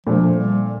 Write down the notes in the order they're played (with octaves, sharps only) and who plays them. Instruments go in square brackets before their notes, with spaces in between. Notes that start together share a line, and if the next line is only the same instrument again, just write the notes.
[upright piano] A#2 A3 D4 [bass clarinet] F3
[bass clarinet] G3